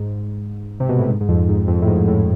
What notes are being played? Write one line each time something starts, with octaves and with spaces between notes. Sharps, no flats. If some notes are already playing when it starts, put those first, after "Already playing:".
Already playing: G#2
C3
B2
A2
G#2
G#2
F2
G#2
F2
A2
G#2
A2